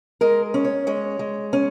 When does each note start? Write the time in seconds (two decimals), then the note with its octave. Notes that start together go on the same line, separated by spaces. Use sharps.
0.21 G#3 A#4
0.54 C#4
0.64 C#5
0.87 G#3 C#5
1.19 G#3
1.53 C#4